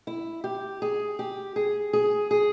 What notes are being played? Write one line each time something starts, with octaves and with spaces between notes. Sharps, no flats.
E4
G4
G#4
G4
G#4
G#4
G#4